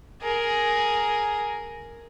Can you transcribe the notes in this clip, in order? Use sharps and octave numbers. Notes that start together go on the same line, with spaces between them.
G#4 A#4